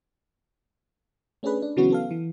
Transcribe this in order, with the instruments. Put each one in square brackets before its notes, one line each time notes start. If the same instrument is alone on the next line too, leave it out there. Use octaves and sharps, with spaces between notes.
[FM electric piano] A3 C#4 D4 G#4 B4
D4
C#3 E3 F#3 B3 C#4 F#4
B3 A4 F5
E3